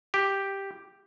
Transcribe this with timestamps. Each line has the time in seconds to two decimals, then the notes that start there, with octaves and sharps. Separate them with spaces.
0.14 G4